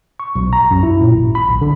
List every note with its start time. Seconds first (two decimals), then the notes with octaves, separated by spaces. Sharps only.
0.20 C#6
0.36 B1
0.53 A#5
0.71 F#2
0.83 E4
1.01 A#2
1.15 G#1
1.35 B5
1.49 B1
1.61 D3